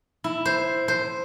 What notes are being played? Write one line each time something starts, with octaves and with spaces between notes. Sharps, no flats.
E4
C5
C5